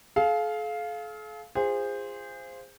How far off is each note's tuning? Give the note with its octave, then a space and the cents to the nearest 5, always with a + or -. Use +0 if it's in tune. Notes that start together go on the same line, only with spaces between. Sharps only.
A4 -45 F5 +0
F4 -5 G#4 -25 C5 +0